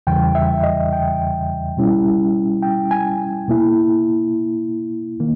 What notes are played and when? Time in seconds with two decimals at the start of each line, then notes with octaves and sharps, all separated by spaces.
0.07 E2 C#3 E3 G3 G5
0.35 E5
0.63 D#5
0.93 G5
1.77 B2 G3 C#4 E4
2.62 G5
2.91 G#5
3.48 B2 A#3 E4
5.20 D#3 A#3